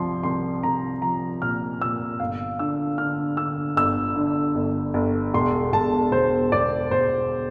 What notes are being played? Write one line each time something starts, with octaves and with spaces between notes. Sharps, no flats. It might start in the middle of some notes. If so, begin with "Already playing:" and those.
Already playing: C2 F3 C6
C2 C6
C2 A#5
F3 A#5
A#2 F6
A#2 E6
G1 F5
D3 E6
D3 F6
D3 E6
G1 E6
D3
G1
G1
E1 C6
E1 A5
E1 C5
E1 D5
E1 C5